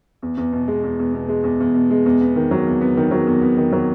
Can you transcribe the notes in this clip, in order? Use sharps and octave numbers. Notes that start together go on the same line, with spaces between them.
E2
E2
B2
G#3
E2
E2
B2
G#3
E2
E2
B2
G#3
E2
B3
D#3
F#3
E2
B3
D#3
F#3
E2
B3
D#3
F#3